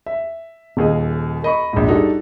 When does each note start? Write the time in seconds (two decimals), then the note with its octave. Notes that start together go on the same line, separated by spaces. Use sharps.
0.06 E5
0.77 D#1 D#2 G#4 D#5
1.43 A#4 D#5 B5 C#6
1.73 A#1 G#2
1.88 G3 D4 D#4 F#4 G#4 A4